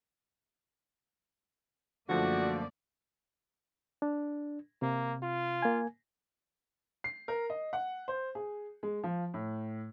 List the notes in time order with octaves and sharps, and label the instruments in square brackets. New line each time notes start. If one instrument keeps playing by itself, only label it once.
[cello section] F#2 A#3 D5 [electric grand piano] D3 F3 A3 [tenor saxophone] F#4
[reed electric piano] D4
[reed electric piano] C3 [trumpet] A#3
[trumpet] F4
[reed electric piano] A#3 G#5
[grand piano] C7
A#4
D#5
F#5
C5
G#4
G#3
F3
A2